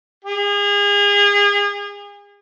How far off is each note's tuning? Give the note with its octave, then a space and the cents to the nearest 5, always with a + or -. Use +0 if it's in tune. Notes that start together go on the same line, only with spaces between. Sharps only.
G#4 -35